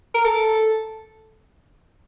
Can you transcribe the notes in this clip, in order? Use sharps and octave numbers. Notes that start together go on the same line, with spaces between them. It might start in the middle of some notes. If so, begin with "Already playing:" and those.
A#4
A4